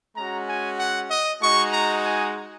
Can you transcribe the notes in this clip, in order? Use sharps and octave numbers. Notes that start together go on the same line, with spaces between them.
G#3 C#4 F#4 A#5
G#5
F#5
D#5
G#3 D#4 F#4 C#6
A#5
G#5